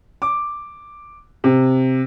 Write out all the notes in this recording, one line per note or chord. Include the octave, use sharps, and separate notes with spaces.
D6
C3